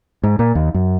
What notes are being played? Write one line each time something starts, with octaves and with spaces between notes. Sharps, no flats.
G#2
A#2
D#2
F#2